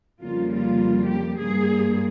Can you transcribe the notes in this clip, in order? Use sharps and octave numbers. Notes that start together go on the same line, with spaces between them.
F2 C#3 G3 A#3 F4
F4
G4
G2 G3 A#3 G#4